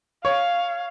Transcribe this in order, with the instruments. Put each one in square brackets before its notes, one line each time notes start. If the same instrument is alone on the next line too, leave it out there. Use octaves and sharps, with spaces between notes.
[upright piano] C#5 [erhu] F5